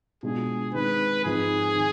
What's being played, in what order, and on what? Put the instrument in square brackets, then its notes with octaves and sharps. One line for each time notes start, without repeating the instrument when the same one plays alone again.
[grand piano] B2 G#3 D4 F4 [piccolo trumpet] G#4
[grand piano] D#3 G#3 C4 D#4 [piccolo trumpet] B4
[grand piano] G#2 F3 C4 D#4 [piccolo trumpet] G#4
[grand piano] D#3